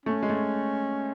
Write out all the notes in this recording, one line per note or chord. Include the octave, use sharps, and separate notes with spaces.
A3 C#4
G#3
A3